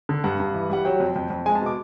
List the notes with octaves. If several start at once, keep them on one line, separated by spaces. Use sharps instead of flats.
D3
G2 F#5
G2
E3
G3 F#5
F#3 G5
F2
F2
F2
G#3 G#5
A5
B2 D6